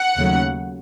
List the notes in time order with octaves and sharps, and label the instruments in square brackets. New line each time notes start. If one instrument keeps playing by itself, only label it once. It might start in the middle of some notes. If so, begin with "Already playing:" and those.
Already playing: [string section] F#5
D#2 C#3 F#3 A3